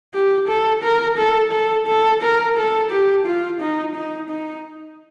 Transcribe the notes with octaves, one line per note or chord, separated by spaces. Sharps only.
G4
A4
A#4
A4
A4
A4
A#4
A4
G4
F4
D#4
D#4
D#4